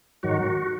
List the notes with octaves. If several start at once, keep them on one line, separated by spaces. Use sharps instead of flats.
G#2 D#3 F#3 F#4